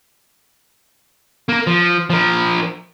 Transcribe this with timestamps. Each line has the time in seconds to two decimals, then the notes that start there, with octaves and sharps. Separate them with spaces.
1.49 A#3 A#4
1.67 F3
2.10 F3 A#4